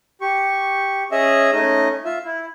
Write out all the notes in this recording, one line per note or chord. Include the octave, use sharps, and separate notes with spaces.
G4 C#6
C#4 G#4 D#5 E5
A3 C#4 D#4 D#5
F4 E5
E4